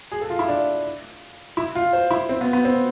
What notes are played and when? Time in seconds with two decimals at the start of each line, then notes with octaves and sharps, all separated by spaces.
0.12 G#4
0.21 A4
0.30 F4
0.39 E4
0.48 D4
1.57 E4
1.75 F4
1.93 C5
2.11 E4
2.29 C4
2.41 B3
2.53 B3
2.65 C4